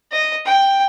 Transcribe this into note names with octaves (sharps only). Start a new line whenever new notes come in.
D#5
G5